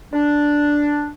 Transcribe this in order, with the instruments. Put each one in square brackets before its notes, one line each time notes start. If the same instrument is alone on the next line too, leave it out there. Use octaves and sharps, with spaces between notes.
[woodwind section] D4